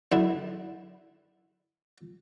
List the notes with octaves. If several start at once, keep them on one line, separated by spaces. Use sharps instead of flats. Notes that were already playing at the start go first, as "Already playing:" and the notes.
F#2 D3 E4